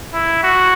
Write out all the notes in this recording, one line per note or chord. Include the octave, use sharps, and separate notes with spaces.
E4
F#4